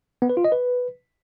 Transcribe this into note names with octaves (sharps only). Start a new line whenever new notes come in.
B3
B4
F4
D#5
B4